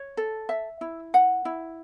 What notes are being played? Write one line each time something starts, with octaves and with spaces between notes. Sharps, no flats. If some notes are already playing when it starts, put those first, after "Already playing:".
Already playing: C#5
A4
E5
E4
F#5
E4